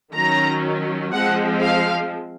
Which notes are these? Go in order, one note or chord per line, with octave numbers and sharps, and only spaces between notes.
D#3 F#3 C#4 A#5
F3 G#3 C4 F#5
F5